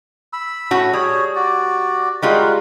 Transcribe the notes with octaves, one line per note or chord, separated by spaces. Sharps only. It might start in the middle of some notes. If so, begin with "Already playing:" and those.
B5 E6
A2 C#4 F#4
G3 G#4 C#5
F#4 D5
G3 G#3 F4 F#4 A#4 B4